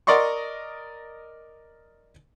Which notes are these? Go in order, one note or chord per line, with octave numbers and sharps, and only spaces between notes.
A#4 D5 D#5 C6 C#6